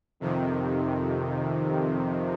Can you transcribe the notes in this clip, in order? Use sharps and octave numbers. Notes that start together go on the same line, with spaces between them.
F2 C3 D#3